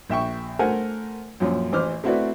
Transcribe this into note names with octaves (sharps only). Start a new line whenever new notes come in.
A#1 E5 G5 C#6
A3 A#4 C5 F#5 G#5
F#2 A#2 F3 C#4
A1 E3 C5 D6 F6
A3 C4 E4 F#4 B4 D5